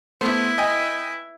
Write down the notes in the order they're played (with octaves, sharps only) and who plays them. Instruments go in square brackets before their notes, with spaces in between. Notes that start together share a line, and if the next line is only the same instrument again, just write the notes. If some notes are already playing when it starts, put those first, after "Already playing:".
[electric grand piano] A3 B3 C5 [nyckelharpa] E4 B4
[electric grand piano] D#5 G5 G#5